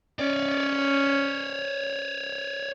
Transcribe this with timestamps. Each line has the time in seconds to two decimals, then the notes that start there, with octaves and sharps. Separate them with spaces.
0.19 C#4 C#5 D5